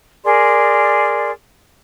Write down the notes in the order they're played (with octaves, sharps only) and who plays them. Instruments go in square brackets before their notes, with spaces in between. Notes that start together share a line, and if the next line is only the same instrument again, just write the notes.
[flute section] G#4 A#4 D5 C6